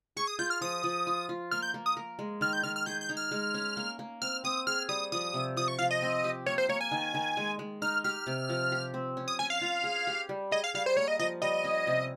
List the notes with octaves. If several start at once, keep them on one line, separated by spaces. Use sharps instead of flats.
G#4 C#6
D#6
F4 G6
F6
F3 D#6
F3
F4
F4
A#3 F6
G6
A#3
D#6
A#4
G#3
D#3 F6
G6
D#3 F6
F6
G#4 G6
G6
D#4
F6
G#3
C#4
A#3
A#3
C4 F6
C4 D#6
G#4 F6
G3 D#6
F3 D#6
C3
F3 D#6
C#6
F3 F5
D#5
C4
G4
A#3 C#5
C5
A#3 C#5
G#5
D#3
D#3
G#3
G#3
D#4 F6
G4 F6
C3
F3
G4
C4
C#4
D#6
C#4 G#5
F5
F4
G#4
G4
G3
G#4 D#5
F5
G3 F5
C5
A#3 C#5
D#5
F3 D#5
G3 D#5
C#4
C3